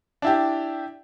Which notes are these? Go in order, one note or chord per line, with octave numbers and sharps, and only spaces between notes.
D4 E4 G4